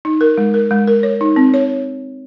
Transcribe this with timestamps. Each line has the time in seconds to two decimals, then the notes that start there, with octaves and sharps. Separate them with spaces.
0.05 D#4
0.21 A#4
0.38 G#3
0.54 A#4
0.71 G#3
0.88 A#4
1.03 C#5
1.21 D#4
1.36 C4
1.54 C#5